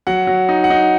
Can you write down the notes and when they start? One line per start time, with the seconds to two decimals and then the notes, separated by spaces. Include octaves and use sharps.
0.07 F#3 F#5
0.27 F#3
0.49 D#4
0.64 F#5
0.70 D#4